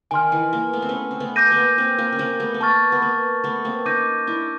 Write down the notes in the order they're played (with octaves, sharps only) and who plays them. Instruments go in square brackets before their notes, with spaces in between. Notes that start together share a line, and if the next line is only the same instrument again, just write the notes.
[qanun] D#3 [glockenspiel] G#5 C6 F6
[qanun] E3
A#3
A3 B3
C4
B3 C#4
C4
A3 B3
[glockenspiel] D6 G6 A#6 D#7
[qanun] B3
A#3
A#3 C4
A#3 C4
C#4
A#3 C4
A3 B3
B3
[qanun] A#3 [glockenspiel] A5 C#6 F6 A6
[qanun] B3
A#3
A3 B3
A#3 C4
[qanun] C#4 D#4 [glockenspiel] D6 G6 A#6 D#7
[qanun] D4 E4